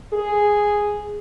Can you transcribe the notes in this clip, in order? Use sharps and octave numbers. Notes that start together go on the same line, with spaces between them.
G#4